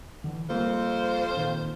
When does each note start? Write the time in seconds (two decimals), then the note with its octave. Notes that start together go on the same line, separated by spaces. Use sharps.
0.24 D3 E3
0.50 F2 G3 A#3 F4 C5
1.37 A#2 D#3